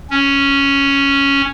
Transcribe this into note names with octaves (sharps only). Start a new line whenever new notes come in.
C#4